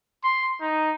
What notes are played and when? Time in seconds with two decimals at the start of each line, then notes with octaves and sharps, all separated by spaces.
0.24 C6
0.61 D#4